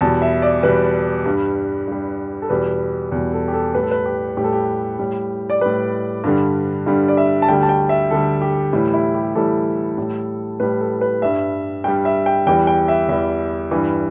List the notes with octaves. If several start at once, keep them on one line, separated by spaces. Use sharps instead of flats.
E2 B2 G3 A5
E5
D5
E2 B2 G3 B4
G2 G3
G2 G3
A4
E2 B2 G3 B4
E2 B2 G3
A4
G4
A4
A2 G3 B4
A4
B4
G4
A2 G3 G4
A4
G4
A2 G3
D5
A2 G3 B4
G2 D3 G3
G2 D3 G3
D5
E5
A5
D2 D3 G3 G5
A5
G5
E5
D2 D3 G3 A4
G4
A2 E3 G3 E4
E4
G4
A2 E3 G3 A4
A2 G3
A2 G3 B4
A4
B4
G2 G3 E5
G2 G3 G5
E5
G5
E2 E3 G3 G5
G5
E5
E2 E3 G3 E5
G2 E3 G3